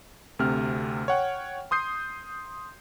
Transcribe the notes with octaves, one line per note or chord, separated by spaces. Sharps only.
D2 C3 C4 F6
C#5 F#5 G5
C6 D#6 G6 C7